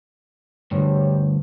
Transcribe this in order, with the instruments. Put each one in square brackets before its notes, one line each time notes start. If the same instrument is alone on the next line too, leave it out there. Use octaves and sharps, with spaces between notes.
[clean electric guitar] D2 G2 [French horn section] G3 D4 C#5